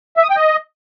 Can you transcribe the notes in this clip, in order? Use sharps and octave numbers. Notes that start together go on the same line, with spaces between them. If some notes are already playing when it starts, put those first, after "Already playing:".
E5
D#6
G5
D#5